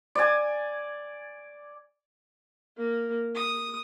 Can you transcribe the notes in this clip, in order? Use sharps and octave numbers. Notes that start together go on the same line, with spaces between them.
D5 G#5
A#3
D#6